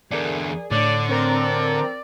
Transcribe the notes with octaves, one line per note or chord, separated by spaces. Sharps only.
E2 D3 G#4 A#4 D5
A2 D3 C#5 D5
C4 A#4 D5 A#5